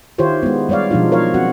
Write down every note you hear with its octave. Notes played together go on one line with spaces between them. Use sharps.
D#3 E4 F4 G4 C5 C#5
G#3 B3
G3 G#3 C#5 D5 F5
B2 F3 G#3 D4 D#4 F4
F#3 A#4 C#5 F5
C4 F#4 F#5